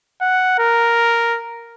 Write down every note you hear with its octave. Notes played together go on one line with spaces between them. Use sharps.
F#5
A#4